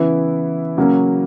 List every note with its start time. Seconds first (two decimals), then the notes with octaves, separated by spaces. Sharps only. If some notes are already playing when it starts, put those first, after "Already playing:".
Already playing: C#3 E3 B3 E4
0.77 C#3 F#3 A#3 C#4